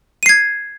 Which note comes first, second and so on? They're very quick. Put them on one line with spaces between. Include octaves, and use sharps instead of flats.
D#7 C7 G#6